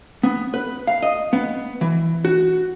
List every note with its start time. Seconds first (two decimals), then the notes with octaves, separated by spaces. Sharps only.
0.23 B3
0.54 B4
0.87 F5
1.02 D#5
1.33 B3
1.81 E3
2.25 F#4